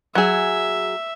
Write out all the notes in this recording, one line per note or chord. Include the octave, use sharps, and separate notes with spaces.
F#3 G#4 E5